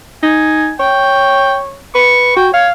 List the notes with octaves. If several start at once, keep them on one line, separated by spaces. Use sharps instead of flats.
D#4 G#5
C#5 G5
B4 C#6
F#4 G5
C#5 F5